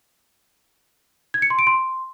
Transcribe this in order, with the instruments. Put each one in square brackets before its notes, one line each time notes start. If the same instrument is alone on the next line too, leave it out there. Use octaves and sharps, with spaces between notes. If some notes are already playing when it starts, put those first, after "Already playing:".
[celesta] G#6
C#7
C6
D7
C6